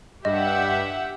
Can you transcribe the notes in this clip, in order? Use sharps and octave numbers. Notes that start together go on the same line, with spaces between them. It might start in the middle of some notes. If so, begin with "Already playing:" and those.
G2 G4 D#5 E5 F#5